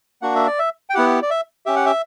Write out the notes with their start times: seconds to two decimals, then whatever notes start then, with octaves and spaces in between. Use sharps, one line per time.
0.22 A#3 D4 F#4 F#5
0.35 E5
0.47 D5
0.59 E5
0.90 G5
0.95 B3 E4 G4 F#5
1.22 D5
1.30 E5
1.66 C#4 G4 E5
1.76 F#5
1.86 E5